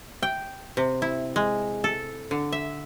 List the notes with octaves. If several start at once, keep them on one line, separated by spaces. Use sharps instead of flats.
G5
C3
E4
G#3
A4
D3
E5